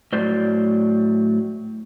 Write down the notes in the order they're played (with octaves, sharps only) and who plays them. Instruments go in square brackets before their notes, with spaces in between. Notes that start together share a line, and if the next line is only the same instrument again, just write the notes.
[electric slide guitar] A2 F#3 C5 D5